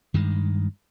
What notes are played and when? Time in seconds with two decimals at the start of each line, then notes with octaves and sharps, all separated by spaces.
0.14 G2 D#3 G#3